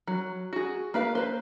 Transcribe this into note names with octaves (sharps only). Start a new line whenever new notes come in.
F#3
F#4 G#4
A#3 B4 F5
B4 C5